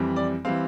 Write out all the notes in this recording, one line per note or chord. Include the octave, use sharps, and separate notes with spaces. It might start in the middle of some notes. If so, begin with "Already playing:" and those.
Already playing: F2 E3 G3 C4
D5
E3 G3 C4 F5